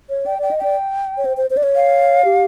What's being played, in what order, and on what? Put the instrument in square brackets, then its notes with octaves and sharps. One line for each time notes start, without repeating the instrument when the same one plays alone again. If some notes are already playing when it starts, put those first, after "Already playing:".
[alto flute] C#5
[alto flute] D5 [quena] G5
[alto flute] D5 [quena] G5
[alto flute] D#5
[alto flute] D5 [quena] G5
[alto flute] C#5
C5
C5
C5
D5
C#5
[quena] F5
[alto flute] G4